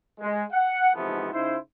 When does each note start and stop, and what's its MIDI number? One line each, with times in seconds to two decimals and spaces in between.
0.21 0.43 56
0.52 0.90 78
0.95 1.32 44
0.95 1.32 48
0.95 1.32 52
0.95 1.32 53
0.95 1.32 57
0.95 1.32 59
1.32 1.57 49
1.32 1.57 63
1.32 1.57 64
1.32 1.57 72